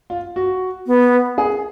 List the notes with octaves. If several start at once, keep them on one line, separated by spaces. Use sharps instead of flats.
F4
F#4
B3
G#4